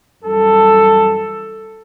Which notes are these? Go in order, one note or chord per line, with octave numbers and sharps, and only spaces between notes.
F#2 E3 G3 A4